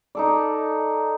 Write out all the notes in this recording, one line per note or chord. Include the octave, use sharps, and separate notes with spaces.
D#4 A4 D5